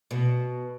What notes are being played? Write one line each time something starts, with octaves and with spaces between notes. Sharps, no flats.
B2